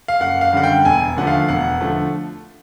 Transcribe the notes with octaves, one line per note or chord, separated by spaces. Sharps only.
F5
F#1 F#5
F5
F#2 D3 G3 F#5
G5
E1 G#5
D#2 D3 F3 A3 F#5
F5
E1 F#5
D3 F3 A3